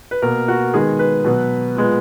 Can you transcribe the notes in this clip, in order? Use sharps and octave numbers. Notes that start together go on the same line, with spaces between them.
B4
B2 A#3 A#4
F#4
D#3 G#3 B3 G#4
B4
B2 F#3 B3
A#2 G#3 B3